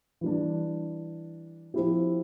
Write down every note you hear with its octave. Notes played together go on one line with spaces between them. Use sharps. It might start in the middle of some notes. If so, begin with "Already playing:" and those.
E3 G3 D4
F3 C4 E4 G4